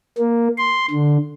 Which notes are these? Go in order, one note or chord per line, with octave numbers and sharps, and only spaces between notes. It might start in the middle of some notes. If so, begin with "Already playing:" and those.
A#3
C6
D3